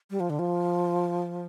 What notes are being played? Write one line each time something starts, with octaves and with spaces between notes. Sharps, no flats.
G3
F3
D3
F3